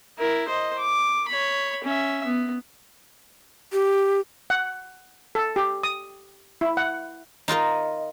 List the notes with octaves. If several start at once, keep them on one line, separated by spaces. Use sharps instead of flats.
E4 A#4
C5 D#5
D6
C#5 B5
C#4 E5
B3
G4
F#5
A4
G4
D#6
E4
F#5
D#4 F4 A#4 D#5